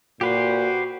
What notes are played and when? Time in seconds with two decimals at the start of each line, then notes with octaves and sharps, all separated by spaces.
0.21 A#2 F#4 G4 B4 C5